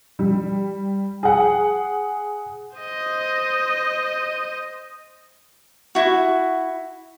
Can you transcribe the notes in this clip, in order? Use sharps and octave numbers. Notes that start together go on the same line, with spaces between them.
G3
G#4 F#5
C5 D#5
E4 F#4